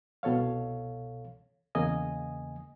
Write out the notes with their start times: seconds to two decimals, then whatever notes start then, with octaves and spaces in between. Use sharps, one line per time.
0.23 C2 B2 A4 C#5 F5
1.75 E2 C#3 A#3 D#5 G#5 D#6